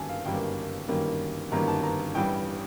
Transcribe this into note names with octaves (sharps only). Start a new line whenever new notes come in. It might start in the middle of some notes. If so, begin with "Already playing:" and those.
Already playing: G1 F#2 D#3 G3 A#3 G#5 A5
F5
G1 F#2 D#3 G3 A#3 G5
G1 F#2 D#3 G3 A#3
G1 F#2 D#3 G3 A#3 A#5
A5
A#5
A1 G2 E3 G3 G5